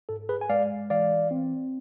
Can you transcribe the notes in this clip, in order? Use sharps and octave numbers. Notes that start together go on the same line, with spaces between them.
G#2 A4
G#4 B4
G#5
G#3 D5 F5
E3 D5 F5
C4